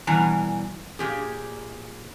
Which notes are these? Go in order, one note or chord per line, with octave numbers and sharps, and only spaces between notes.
B2 E3 G3 G#5 A#5
A#2 G4 G#4